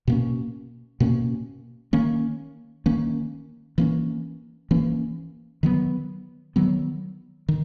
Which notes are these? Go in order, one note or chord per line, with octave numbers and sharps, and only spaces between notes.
B2 A#3 C#4
B2 A#3 C#4
D#3 A#3 C#4
D#3 A#3 C#4
E3 A#3 C#4
E3 A#3 C#4
D#3 F#3 B3
D#3 F#3 B3
D#3